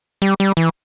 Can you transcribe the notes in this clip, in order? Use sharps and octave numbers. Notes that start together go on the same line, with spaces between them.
G3
G3
E3